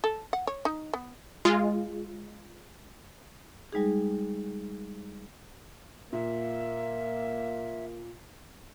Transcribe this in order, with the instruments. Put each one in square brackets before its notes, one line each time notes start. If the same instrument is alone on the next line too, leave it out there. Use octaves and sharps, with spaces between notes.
[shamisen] A4
F#5
C#5
D#4
B3
[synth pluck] G#3 F4
[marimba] G3 G#3 D#4 G#4
[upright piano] A#2 [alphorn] A#3 [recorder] E5